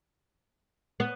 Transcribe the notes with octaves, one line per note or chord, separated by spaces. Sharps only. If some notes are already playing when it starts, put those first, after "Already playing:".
B3